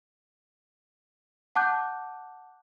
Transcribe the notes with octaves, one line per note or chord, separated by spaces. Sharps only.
F#5 A5 D6 F#6 G6